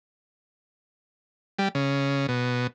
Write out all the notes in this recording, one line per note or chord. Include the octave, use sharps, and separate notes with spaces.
G3
C#3
B2